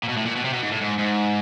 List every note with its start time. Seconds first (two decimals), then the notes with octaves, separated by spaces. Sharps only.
0.03 A#2
0.09 B2
0.17 A2
0.26 A#2
0.36 B2
0.45 C3
0.53 B2
0.63 G#2
0.72 A2
0.81 G#2
0.98 G#2